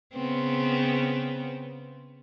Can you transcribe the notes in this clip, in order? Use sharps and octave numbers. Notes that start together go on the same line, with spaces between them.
C#3 B3 C4